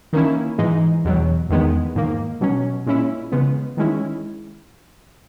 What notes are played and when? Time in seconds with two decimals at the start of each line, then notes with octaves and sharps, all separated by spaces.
0.13 D#3 A#3 C#4 E4
0.58 G#2 E3 G#3 D#4
1.05 E2 B2 F#3
1.50 E2 D#3 G#3 B3
1.95 G#2 D#3 A#3
2.41 B2 F#3 C#4
2.86 A#2 G#3 C#4 E4
3.32 C#3 G#3 B3
3.77 D#3 G#3 C#4 E4